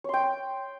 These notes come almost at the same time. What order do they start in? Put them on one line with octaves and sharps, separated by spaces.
C#5 C6 G5